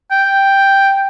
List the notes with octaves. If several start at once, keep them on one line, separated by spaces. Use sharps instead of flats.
G5